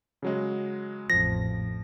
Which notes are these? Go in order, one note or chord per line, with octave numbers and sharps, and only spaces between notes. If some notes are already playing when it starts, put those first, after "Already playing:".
C#3 F#3 G#3
A1 F2 F3 A#6